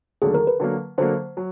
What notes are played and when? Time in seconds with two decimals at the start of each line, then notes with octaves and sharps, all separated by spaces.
0.22 D#2 D3 F#3 A3 G#4
0.35 A#4
0.47 B4
0.60 D3 F#3 A#3
0.98 D3 F#3 A#3 C5
1.37 F#3